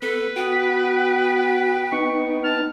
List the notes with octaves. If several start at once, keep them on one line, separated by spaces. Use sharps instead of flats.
B3 A4 B4
B3 F#4 G5
B3 D#4 C#6
A5 F6